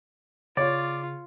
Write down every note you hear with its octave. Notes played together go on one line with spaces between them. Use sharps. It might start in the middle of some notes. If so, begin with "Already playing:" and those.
C#3 F4 C#5 D5